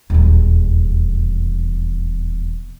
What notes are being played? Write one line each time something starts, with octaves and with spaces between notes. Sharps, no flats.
D#1 E2